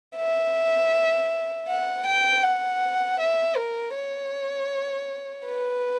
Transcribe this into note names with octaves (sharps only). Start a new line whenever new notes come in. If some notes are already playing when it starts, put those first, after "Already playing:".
E5
F#5
G5
F#5
E5
A#4
C#5
B4